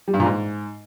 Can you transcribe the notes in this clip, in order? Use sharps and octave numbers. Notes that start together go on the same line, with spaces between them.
G3
G2
A#2
G#2